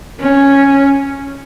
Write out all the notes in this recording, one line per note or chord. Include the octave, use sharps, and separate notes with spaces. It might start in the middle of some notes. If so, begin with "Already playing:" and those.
C#4